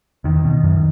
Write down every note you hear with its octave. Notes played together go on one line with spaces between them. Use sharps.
E2 D#3
B2
F#2